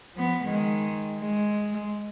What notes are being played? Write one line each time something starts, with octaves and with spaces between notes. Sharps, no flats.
F3 B3
D#3 G#3
G#3